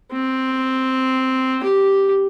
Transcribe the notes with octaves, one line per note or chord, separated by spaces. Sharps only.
C4
G4